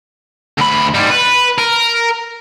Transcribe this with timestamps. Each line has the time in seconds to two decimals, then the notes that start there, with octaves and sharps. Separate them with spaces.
0.58 D2 B5
0.95 G#2 G3
1.10 B4
1.58 A#4